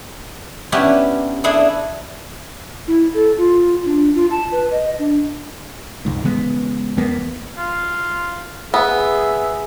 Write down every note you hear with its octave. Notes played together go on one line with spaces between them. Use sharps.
B3 C#4 D4 E4 G4
D4 E4 G#4 A4 D5
E4
A4
F4
D4
F4
A5
B4
D#5
D4
F1 C#2 G#2
C#3 E3 G#3 B3
E2 A#3 B3
F4
B3 G#4 E5